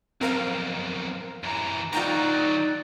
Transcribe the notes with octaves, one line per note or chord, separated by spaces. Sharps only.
B1 F2 C4 A#4 F5
F#2 E3 A#5
D2 F#3 D#4 F4 A4 D5 G5 A#5